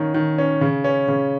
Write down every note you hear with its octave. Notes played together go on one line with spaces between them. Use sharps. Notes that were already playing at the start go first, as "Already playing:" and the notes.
Already playing: D#3 A#3 C#4
D#3
C#4
C#3
C#4
C#3